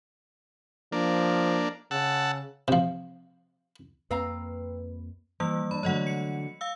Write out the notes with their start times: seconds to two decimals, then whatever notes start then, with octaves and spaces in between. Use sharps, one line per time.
0.92 F3 A#3 D4
1.91 C#3 F#5 A5 E6
2.68 C3 F3
4.11 F2 A#3 C4 B4 F5 A#5
5.40 E3 G3 A#3 E6
5.71 D4 B5
5.83 D3 F#3 A3 C#5 D#5 F#5
6.07 C#7
6.61 F5 E6